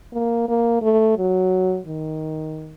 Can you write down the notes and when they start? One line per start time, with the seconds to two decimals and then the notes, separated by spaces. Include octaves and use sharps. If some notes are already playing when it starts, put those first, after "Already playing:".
0.13 A#3
0.48 A#3
0.82 A3
1.17 F#3
1.87 D#3